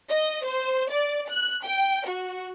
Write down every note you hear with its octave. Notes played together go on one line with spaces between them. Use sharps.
D#5
C5
D5
F#6
G5
F#4